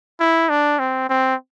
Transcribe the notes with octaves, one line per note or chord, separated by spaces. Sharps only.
E4
D4
C4
C4